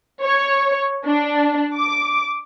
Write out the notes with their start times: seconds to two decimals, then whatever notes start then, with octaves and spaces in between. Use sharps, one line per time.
0.22 C#5
1.05 D4
1.77 D6